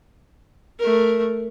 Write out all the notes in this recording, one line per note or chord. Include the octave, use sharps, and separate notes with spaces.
A3 A#4